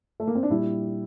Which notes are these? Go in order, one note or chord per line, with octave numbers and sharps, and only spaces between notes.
A3
A#3
C4
D4
A#2 G3 E4